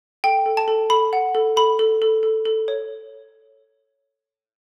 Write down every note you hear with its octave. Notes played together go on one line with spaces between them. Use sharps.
A4 G5
A4
A5
A4
A4 B5
F#5
A4
A4 B5
A4
A4
A4
A4
C#5